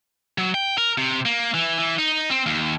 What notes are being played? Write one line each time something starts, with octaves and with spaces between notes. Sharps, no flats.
F#3
G5
A#4
C3
A#3
E3
E3
D#4
C4
D#2